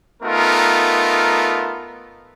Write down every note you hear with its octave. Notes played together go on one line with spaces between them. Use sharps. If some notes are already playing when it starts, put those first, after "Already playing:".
A3 B3 D#4 F4 A#4